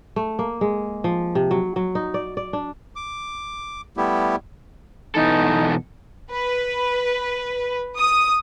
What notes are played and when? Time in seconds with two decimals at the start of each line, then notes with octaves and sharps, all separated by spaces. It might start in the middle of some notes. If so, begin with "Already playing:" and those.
0.16 A3
0.39 A#3
0.61 G#3
1.04 F3
1.35 C3
1.51 F#3
1.76 F#3
1.95 D#4
2.14 D5
2.37 D5
2.53 D4
2.96 D6
3.97 G3 A3 B3 E4 G4
5.15 B2 E3 D#4 A4
6.31 B4
7.97 D#6